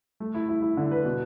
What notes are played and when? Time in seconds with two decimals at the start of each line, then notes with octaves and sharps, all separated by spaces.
0.20 A3
0.34 E4
0.49 E4
0.62 E4
0.77 D3
0.91 B4
1.05 B2